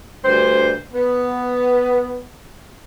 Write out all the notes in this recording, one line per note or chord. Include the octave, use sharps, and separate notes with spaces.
D2 G2 C5
B3